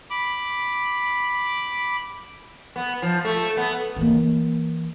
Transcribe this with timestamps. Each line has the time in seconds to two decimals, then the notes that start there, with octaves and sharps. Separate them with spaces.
0.10 B5 D6
2.76 B3
3.02 F3
3.25 A3
3.57 B3
3.96 E3 A#3